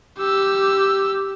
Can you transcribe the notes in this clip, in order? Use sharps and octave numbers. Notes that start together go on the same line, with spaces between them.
G4 E6